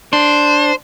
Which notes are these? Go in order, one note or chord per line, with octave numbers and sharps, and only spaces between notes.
D4 C5